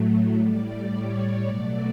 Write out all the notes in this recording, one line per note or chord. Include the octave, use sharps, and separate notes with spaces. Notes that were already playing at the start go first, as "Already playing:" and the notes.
Already playing: A2 F#3 A3
A2 G3 D5
C#5
B2 F#3 A3 D5